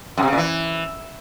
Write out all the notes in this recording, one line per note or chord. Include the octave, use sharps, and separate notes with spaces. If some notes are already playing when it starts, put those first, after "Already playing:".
F#2
C3
C#3
A#2
E3